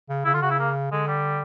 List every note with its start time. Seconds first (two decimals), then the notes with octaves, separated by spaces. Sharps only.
0.09 C#3
0.25 C#3 E4
0.34 D3 F4
0.42 C#3 F#4
0.50 E4
0.59 A#3
0.91 D3 G#3
1.08 G3